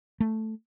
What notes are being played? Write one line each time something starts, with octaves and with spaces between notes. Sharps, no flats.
A3